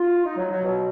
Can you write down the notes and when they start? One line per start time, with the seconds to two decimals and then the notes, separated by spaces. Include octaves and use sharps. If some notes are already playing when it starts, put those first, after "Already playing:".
Already playing: F4
0.25 D#4
0.37 F#3
0.51 F#3
0.64 B2